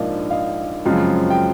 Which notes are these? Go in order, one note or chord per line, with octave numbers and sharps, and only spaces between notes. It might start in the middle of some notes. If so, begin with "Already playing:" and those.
Already playing: A#1 G#2 F3 A#3 D4 D#5 F5
D#5 F5
F#2 C#3 F3 G#3 C4
G5